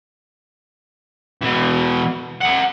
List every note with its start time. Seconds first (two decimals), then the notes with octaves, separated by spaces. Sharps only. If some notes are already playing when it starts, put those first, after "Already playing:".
1.42 B2 E3
2.41 A#4 F#5